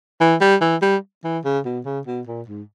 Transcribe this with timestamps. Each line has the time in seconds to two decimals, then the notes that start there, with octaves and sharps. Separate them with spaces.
0.20 E3
0.41 G3
0.61 E3
0.82 G3
1.24 E3
1.44 C#3
1.65 B2
1.85 C#3
2.07 B2
2.27 A#2
2.48 G#2